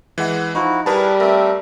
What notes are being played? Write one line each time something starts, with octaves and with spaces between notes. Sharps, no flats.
E3 G#3 F#5
F3 D#4 E4 F#4
G3 E4 G#4 A#4 B4 A5
A3 C4 A#4 E5